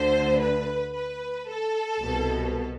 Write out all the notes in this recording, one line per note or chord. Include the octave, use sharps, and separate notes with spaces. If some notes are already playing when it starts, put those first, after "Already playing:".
Already playing: D2 D3 C5
B4
B4
A4
C2 B2